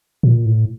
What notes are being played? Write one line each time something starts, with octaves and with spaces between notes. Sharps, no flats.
A#2
A2